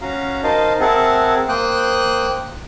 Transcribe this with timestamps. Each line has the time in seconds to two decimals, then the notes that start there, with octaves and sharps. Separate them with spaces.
0.01 C#4 F#4 F5 A#5
0.43 D#4 A#4 C5 D#5 F5 A5
0.80 C4 G#4 A#4 E5 F#5 A5
1.49 A#3 C5 G5 D#6 F#6